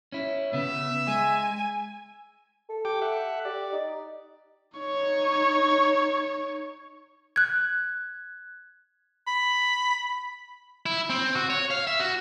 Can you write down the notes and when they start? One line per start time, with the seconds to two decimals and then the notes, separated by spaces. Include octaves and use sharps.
0.12 C#4 E4
0.53 C#3 B3 E5
1.08 G#3 G#5
2.69 A4
2.85 G4 G5 D6
3.02 E5 F#5
3.45 G4 D5
3.72 D#4
4.78 D#4 C#5
7.36 F#6 G#6
9.28 B5
10.86 E4
11.10 C4
11.35 F#4
11.50 C#5
11.71 F5
11.87 E5
12.00 F#4